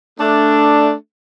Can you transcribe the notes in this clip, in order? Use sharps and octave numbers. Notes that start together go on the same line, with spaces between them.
A3 D4